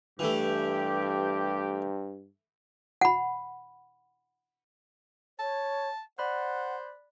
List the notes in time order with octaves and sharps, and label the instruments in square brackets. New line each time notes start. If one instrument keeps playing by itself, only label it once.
[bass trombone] G2 [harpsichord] E3 A3 [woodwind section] G4
[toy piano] F#5 B5
[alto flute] C#5 [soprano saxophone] A5
[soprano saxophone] C5 [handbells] D5 B5 F#6 [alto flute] F#5